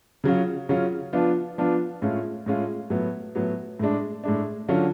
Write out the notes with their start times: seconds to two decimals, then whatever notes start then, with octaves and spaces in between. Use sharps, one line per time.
0.24 C#3 F#3 C#4 F4
0.69 C#3 F#3 C#4 F4
1.13 F3 B3 D4 F4
1.58 F3 B3 D4 F4
2.02 A2 G#3 C#4 F4
2.46 A2 G#3 C#4 F4
2.90 A2 F#3 B3
3.35 A2 F#3 B3
3.79 A2 G#3 D4
4.24 A2 G#3 D4
4.68 D3 F#3 C#4 F4